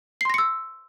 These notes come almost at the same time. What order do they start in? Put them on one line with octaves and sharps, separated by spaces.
C7 C6 A#6 C#7 E6